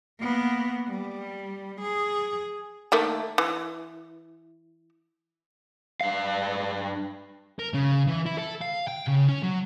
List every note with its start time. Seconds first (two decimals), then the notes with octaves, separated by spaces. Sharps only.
0.19 A#3 B3
0.87 G3
1.81 G#4
2.92 D#3 A3 A#3
3.38 E3
6.01 G2 F5
7.59 A#4
7.74 C#3
8.08 E3
8.26 E4
8.38 A4
8.61 F5
8.87 G5
9.07 C#3
9.28 C#4
9.43 F#3